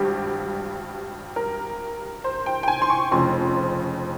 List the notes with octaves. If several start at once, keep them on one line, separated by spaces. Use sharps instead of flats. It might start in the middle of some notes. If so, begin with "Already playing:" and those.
Already playing: G#1 G2 G3 G4
A#4
C5
G5
G5
G#5
C6
C#6
F1 F2 C#3 F3 C6